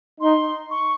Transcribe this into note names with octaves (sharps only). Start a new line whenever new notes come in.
D#4 C6
C#6